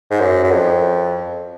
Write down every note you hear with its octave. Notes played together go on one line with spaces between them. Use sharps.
G#2
F#2
F#2
F2